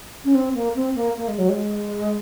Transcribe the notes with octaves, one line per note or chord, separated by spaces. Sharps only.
C#4
C4
A#3
C4
A#3
A#3
G#3
F#3
G#3